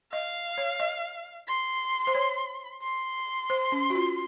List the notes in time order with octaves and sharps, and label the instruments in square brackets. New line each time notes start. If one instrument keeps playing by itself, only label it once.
[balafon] D#5 [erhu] F5
[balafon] C#5
D#5
[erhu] C6
[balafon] C5
C#5
[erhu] C6
[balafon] C5
C#4
F#4
F4